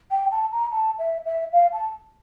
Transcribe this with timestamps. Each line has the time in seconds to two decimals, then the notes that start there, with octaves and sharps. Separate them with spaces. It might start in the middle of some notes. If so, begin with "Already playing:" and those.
0.11 G5
0.32 A5
0.52 A#5
0.72 A5
0.99 E5
1.26 E5
1.53 F5
1.73 A5